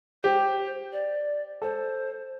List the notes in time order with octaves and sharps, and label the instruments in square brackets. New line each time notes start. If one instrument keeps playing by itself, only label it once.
[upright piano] G4 [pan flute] C5
[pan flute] D5
[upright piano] A4 [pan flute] C5